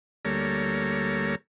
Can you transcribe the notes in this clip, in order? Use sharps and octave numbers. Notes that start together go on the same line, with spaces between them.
D2 G3 A#3 A4 C#5 A#5